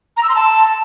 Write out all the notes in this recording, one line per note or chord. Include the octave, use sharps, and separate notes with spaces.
A#5
E6
C6
A5